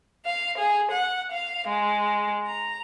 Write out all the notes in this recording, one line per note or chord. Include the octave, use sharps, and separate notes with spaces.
F5
G#4
F#5
F5
G#3
A#5